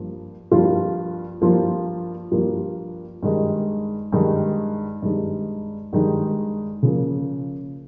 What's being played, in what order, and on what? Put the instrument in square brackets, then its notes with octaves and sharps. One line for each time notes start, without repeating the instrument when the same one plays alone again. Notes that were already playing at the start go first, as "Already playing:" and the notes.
Already playing: [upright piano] G2 F3 A#3
G2 F3 A#3 F4
G2 F3 A#3 F4
G2 F3 A#3 F4
G2 D#3 G#3 D#4
G2 D#3 G#3 D#4
G2 D#3 G#3 D#4
G2 D#3 G#3 D#4
C#3 F3 A#3